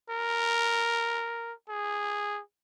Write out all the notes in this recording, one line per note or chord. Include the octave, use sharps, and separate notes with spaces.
A#4
G#4